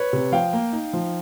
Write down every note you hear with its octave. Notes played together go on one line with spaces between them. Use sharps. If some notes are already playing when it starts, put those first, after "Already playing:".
Already playing: B4 C#5
C3
F3 F5 G5
A#3
D#4
F3